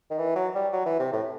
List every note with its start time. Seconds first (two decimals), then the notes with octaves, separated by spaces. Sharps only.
0.10 D#3
0.18 E3
0.36 F#3
0.55 G3
0.73 F#3
0.86 E3
0.99 C3
1.13 A2